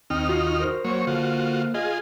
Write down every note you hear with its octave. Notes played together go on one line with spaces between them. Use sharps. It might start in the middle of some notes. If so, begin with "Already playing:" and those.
D#2 C4 D#4 F6
F4 F#4
A#4 C5
F#3 A#3 C5 C#5
D3 F4 F#4
F4 G#4 D#5